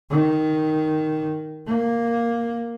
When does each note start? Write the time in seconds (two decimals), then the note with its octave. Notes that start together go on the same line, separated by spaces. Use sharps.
0.10 D#3
1.67 A#3